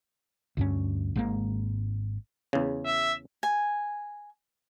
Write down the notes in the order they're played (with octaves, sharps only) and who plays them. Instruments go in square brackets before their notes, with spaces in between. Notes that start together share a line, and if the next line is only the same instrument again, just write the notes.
[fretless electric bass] D2 G2 C#4
G#1 G#2 A#3
[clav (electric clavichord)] E2 C#3
[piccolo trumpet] E5
[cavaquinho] G#5